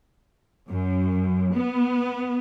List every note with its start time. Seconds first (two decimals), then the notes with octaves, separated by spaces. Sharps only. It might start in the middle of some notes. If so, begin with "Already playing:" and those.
0.66 F#2
1.53 B3